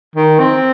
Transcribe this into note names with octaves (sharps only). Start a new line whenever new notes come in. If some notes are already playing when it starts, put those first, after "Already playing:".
D#3
C4